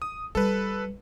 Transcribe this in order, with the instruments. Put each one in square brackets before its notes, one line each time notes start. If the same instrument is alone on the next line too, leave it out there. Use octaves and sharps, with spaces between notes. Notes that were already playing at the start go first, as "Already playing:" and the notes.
[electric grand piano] D#6
[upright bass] G3 [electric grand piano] A4 B4